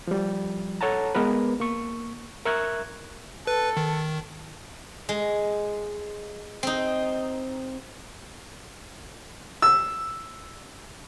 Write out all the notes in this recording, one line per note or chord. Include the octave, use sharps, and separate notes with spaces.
F3 G3
A4 C#5 F#5 A5 A#5
G#3 B3 A#4 B4
A#3 C#6
A#4 E5 C#6 F#6 G#6
A4 B4
D#3
G#3
C4 D#4
E6